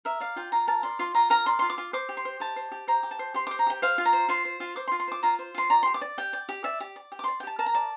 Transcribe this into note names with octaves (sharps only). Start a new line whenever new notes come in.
A#4 E5
D5 F5
F4 G5
F4 A#5
A#4 A5
D5 C6
F4 C6
F4 A#5
A#4 A#5
D5 C6
F4 C6
D6
F4
C5 D6
G4
C6
C5
G4 A5
C5
G4
C5 A#5
G4
A5
C5
G4 C6
C5 D6
A#5
G4 G5
C5 F5
F4
A#5
C5
F4 C6
C5
F4
C5 D6
C6
F4
C6
C5 D6
F4 A#5
C5
F4 C6
D5 A#5
G4 C6
D6
D5
G4 G5
D5
G4
D5 E5
G4
D5
G4
D6
D5 C6
G5
G4 A5
A#4 A5
A#5
D5 A5